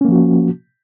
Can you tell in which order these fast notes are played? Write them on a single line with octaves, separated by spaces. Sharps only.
C#4 A#3 F3 F#4